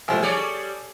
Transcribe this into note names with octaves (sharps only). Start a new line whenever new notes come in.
C2 F3 A3
G3 G#4 A4 C#5 D5